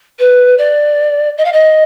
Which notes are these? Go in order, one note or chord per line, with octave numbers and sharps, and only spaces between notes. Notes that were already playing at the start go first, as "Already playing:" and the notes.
B4
D5
D#5
F5
D#5